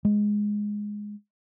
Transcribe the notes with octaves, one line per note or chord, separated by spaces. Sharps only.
G#3